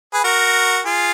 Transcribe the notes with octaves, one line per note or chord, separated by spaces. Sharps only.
G#4 B4
F#4 A#4
F4 G#4